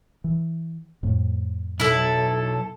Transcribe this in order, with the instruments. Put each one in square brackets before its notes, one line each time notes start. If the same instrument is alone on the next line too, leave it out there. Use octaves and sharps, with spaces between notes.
[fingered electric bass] E3
F2 A2
[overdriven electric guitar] B1 [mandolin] E4 A4